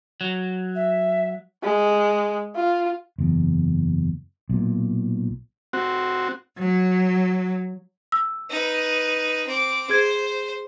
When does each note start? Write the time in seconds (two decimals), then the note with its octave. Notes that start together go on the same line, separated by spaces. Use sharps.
0.21 F#3
0.75 E5
1.63 G#3
2.55 F4
3.18 F#1 E2
4.49 B1 A#2
5.73 C4 F#4
6.58 F#3
8.12 E6
8.50 D#4 B4
9.46 C4 D6
9.90 G#4 C5 G#6